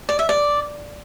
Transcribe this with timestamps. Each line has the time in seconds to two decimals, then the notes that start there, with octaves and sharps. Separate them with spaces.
0.09 D5
0.19 E5
0.29 D5